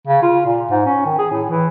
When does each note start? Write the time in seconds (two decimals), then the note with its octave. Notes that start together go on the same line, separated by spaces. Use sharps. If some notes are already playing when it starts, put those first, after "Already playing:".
0.07 C#3
0.22 F4
0.45 A#2
0.71 G#2
0.86 C#4
1.05 D#3
1.19 G#4
1.31 A2
1.50 E3